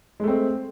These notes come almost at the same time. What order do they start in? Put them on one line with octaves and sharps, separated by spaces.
G#3 A3 C4